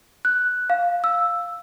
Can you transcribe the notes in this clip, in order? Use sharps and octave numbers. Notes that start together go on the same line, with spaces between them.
F#6
F5
E6